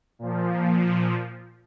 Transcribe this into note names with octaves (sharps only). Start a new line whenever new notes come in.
A#2 F3